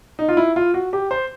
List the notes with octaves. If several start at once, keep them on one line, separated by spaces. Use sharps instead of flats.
D#4
F4
E4
F4
F#4
G4
C5